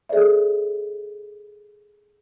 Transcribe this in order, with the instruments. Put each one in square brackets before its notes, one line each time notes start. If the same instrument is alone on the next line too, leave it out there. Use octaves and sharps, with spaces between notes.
[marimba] G#4 A4 C5 D5 E5